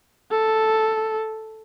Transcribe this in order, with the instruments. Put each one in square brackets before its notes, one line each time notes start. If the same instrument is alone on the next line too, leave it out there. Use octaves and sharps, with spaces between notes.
[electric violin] A4